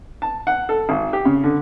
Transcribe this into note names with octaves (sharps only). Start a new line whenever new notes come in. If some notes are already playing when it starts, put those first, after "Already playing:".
A5
F#5
A4
G#1
G4
C#3
D3